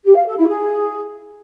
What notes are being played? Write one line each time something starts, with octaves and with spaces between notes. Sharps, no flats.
G4
F5
A4
E4
G#4